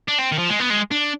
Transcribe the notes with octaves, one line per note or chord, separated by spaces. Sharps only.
D4
C4
D#3
F3
G#3
B3
G#3
D4